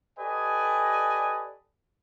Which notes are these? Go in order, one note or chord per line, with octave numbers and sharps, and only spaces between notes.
G4 A4 B4 D5 D#5 G#5